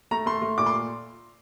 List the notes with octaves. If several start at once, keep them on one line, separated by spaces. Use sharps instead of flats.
A3 A#5
A3 C6
A3
A#2 D6
C6